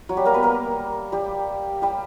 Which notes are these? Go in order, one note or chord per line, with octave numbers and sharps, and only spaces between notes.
F#3 F#4
G3 G4
A#3 A#4
B3 B4
A#3 A#4
G3 G4
G3 G4